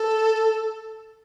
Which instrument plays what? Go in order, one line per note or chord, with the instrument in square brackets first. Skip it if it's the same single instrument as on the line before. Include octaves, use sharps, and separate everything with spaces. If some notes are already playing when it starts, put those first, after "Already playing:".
Already playing: [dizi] A4